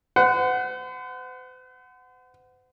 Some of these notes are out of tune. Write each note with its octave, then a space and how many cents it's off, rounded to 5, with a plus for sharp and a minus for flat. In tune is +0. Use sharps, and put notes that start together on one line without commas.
C5 -45 F#5 +0